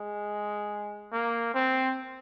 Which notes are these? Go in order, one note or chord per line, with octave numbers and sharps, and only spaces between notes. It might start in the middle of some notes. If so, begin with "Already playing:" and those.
Already playing: G#3
A#3
C4